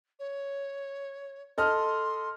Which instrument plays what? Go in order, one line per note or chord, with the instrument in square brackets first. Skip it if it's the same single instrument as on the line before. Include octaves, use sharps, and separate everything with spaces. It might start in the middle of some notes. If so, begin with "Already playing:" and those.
[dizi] C#5
[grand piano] A4 D#5 F6 [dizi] C6